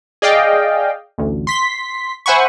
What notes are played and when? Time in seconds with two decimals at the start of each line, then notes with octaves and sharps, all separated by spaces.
0.22 G#4 D5 D#5 F5 G5
1.18 A1 D2
1.47 C6 B6
2.26 C5 E5 F#5 G#5 B5 C#6